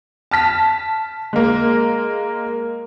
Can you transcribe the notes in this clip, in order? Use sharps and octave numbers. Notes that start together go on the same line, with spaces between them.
A5 F6 B6
G#3 A#3